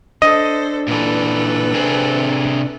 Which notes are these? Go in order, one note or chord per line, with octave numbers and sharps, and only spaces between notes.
D4 A4 C5 D#5
A#2 E3 A4 B4
C3 C4 G#4